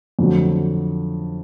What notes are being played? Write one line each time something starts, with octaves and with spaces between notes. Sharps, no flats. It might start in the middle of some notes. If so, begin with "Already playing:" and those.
F2 D3 F#3 A3